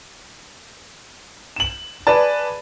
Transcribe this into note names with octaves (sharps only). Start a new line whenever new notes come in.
E7 F#7
G#4 B4 D5 A5